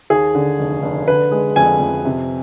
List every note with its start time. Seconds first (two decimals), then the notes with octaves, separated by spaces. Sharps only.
0.10 D#2 G#4
0.35 D3
0.59 F1
0.83 F1
1.07 D3 B4
1.31 G#3
1.56 F2 G#5
1.80 F2
2.05 C3